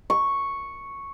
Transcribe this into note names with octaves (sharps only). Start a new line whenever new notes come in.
C#6